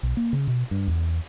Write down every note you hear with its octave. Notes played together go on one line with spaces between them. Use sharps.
B1
A#3
C#3
B2
G2
E2